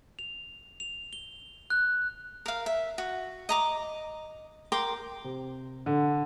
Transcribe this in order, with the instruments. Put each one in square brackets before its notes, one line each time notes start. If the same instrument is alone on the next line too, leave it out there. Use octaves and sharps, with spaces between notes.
[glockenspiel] F7
F7
G7
F#6
[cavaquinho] A#4 F5
E5
F#4
D#5 A#5 D6
A#4 G5 C6 D6
[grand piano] C3
D3